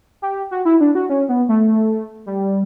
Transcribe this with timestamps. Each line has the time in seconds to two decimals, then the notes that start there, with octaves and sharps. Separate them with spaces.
0.22 G4
0.51 F#4
0.65 E4
0.81 D4
0.95 F#4
1.10 C#4
1.29 B3
1.49 A3
2.26 G3